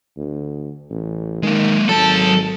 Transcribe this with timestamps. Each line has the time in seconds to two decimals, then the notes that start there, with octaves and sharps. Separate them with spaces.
0.17 D2
0.90 A1
1.43 D#3 G#3 A#3
1.89 G#1 F#3 A4 A5